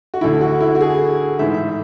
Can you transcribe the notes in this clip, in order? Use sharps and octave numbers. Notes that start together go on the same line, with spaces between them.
F#4
D2 D3 E4
F#4
E4
F#4
G#4
A1 G#2 E3 E5
E5